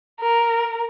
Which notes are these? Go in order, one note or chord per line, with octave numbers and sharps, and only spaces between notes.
A#4